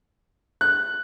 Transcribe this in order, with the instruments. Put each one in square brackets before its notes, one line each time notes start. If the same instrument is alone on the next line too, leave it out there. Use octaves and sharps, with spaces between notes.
[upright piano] F#6